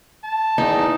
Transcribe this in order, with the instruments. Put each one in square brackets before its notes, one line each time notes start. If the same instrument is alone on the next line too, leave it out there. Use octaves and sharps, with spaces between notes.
[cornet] A5
[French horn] E2 [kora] D#4